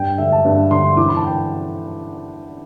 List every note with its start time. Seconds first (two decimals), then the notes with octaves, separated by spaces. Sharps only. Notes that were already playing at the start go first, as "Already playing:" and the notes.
Already playing: G2 G5
0.18 D3 E5
0.32 A5
0.45 G2
0.71 D3 C6
0.97 E3 D6
1.08 B5
1.16 A5
1.25 G5